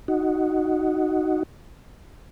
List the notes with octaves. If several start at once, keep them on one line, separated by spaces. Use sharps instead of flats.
D#4 F#4